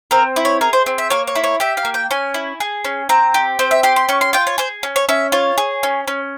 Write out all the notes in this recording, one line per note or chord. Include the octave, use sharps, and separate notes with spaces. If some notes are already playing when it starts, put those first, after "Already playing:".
C4 A#4
E4
C#5
G#4 A#4
C5
C4
E5
A#3 C#5
C#5
E4
C#5
G4 E5
F5
A#3
G5
C#4 G#5
E4
G#4
C#4
C4 A#5
G4
C4 C5
E5
G4 C6
C6
C#4 C#6
C6
F4 G5
C#5
G#4 C5
C#4
C#5
C#4 E5
F4 C#5
G#4
C#4
C#4